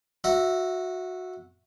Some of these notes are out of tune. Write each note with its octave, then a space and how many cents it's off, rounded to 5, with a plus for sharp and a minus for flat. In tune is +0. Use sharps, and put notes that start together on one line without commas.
F#4 -15 E5 +0 A#5 +0